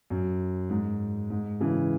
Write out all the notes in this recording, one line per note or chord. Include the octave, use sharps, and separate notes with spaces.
F#2
G#2
G#2
C#3 E3